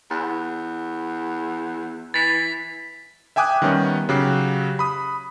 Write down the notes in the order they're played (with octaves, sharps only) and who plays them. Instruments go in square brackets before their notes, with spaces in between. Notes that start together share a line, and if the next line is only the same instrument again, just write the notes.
[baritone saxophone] E2
[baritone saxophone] E3 [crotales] A6 B6
[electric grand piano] E5 G5 G#5 D6 D#6 F#6
D#3 G3 B3 C#4
C#3 F#3 G4 F#6 C7
B5 D#6